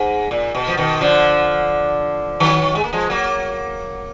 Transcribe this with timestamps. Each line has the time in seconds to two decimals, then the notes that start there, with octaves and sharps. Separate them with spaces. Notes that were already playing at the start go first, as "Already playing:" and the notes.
Already playing: G#2
0.31 A#2
0.55 B2
0.68 F3
0.77 B2 D#3
1.01 D3 F3
2.40 D#3 F#3
2.75 G#3
2.84 A#3
2.93 F3 G#3
3.10 F#3 A#3